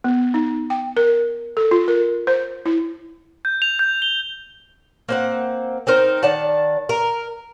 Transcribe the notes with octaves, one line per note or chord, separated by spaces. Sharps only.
B3
D#4
G5
A#4
A4
F4
A#4
C5
E4
G6
F7
G6
G7
A#3 C4 F#5
C4 D#4 A#4 C5
D#3 D5 F#5 A5
A#4